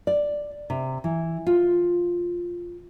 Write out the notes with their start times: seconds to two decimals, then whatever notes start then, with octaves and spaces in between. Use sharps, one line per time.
0.07 D5
0.70 C3
1.04 E3
1.47 F4